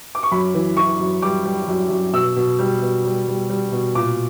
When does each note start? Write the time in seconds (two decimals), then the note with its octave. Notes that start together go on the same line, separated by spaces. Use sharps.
0.15 D6
0.23 C#6
0.32 F#2 B5
0.54 E3
0.77 E3 C#6
1.00 F#2
1.22 G3 D6
1.45 G3
1.68 F#2
1.90 F#2
2.13 B2 E6
2.36 B2
2.59 G3
2.82 B2
3.04 G3
3.27 G3
3.50 G3
3.72 B2
3.95 A#2 D6